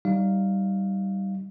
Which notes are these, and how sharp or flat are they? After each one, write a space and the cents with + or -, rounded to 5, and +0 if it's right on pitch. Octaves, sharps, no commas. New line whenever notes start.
G3 -15 D#4 +0 F5 +0